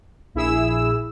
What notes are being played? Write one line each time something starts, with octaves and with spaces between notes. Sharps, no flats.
A#1 E4 G#4 E6